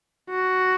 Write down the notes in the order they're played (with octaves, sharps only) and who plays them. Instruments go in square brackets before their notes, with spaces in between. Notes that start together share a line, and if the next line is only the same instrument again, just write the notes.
[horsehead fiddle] F#4